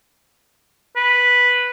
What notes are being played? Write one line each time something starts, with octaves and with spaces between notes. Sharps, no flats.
B4